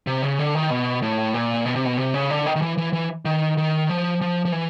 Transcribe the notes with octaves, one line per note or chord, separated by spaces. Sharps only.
C3
C#3
D3
D#3
B2
A2
A#2
B2
C3
B2
C3
C#3
D3
D#3
D#3
E3
E3
E3
D#3
D#3
F3
F3
F3
E3